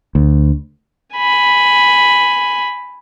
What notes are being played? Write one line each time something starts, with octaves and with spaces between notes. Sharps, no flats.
D2
G#5 B5